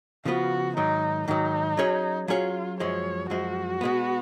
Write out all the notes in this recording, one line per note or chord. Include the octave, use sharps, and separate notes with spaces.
C#3 F3 B3 F4 F#4 B4
G#2 D#3 F#3 D#4
G#2 D#3 F#3 D#4
F#3 C#4 G#4 C#5
F#3 C#4 F4 G#4 C#5
F#2 F3 G#3 C#5
F#2 F3 G#3 F#4
B2 G#3 B3